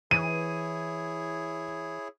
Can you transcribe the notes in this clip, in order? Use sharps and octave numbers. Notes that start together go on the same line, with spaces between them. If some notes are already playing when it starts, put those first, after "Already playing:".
E3 E4 G#4 C#5 D#7